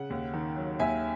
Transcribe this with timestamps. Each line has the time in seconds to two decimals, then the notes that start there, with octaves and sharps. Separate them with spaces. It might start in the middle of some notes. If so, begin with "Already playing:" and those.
Already playing: C#3 F#5
0.10 D#2
0.34 D#3
0.56 F#3
0.79 D#2 E5 G#5